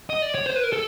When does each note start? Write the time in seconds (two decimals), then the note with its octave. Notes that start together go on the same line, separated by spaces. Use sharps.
0.10 D#5
0.22 D5
0.35 C#5
0.46 C5
0.56 B4
0.63 A#4
0.73 A4